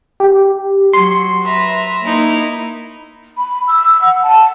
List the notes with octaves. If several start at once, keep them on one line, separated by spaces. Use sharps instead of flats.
G4
F#3 C6
B4 E5 A#5
A#3 D#4 E4
B5
E6
F#5
A5